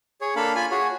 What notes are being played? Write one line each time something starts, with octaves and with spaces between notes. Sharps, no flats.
G#4 C#5
A#3 D4 A4 F5 B5
F4 G#5 B5
F#4 G#4 C#5